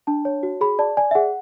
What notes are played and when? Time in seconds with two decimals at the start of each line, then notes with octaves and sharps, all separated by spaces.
0.07 D4 A5
0.25 C#5
0.43 F#4
0.61 G#4 B5
0.79 D5 A5
0.97 D5 G#5
1.11 E5
1.15 G#4 F#5